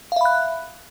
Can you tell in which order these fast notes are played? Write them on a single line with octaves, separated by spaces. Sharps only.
F5 E5 B5 F#6